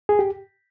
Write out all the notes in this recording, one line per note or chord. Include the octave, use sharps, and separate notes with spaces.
G#4
G4